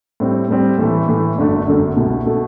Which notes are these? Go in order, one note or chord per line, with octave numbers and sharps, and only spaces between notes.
A2 G3 C4
A2 G3 C4
A2 E3 A3
A2 E3 A3
G1 F#2 D3 A3
G1 F#2 D3 A3
C2 B2 A3
B2 A3